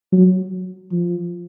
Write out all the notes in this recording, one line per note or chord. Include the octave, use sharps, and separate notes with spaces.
F#3
F3